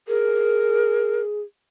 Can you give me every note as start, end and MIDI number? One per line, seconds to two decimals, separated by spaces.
0.08 1.42 68
0.08 1.22 70